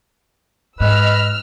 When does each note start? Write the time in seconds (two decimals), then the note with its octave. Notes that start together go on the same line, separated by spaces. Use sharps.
0.80 G#2 B4 D#5 E6 F6